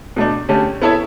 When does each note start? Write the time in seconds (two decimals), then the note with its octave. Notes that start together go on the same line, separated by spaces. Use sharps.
0.16 B2 A3 D4
0.49 D3 A3 C#4 G4
0.82 B3 E4 A4 C#5 E5